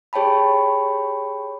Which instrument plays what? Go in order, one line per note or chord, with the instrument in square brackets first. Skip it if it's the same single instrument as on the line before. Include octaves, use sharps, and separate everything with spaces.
[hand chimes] G4 G#4 C#5 G5 A5 B5